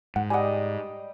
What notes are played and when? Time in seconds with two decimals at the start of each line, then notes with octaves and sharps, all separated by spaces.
0.16 G#2 F#5
0.30 G3 D#5 F#5 G#5